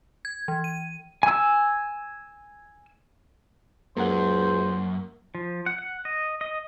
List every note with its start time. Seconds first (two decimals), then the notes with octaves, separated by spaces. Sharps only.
0.25 G#6
0.48 E3
0.64 D#7
1.23 G#5 E6
3.97 C#2 F#2 A#3 A#4 C5 F#5
5.35 F3
5.66 F#5
5.78 F#5
6.05 D#5
6.41 D#5